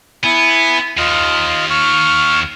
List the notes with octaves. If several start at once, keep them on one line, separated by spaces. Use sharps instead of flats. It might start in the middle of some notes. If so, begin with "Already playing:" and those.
B3 E4 G#5
D#2 F4 D#5 F6
C#6 F6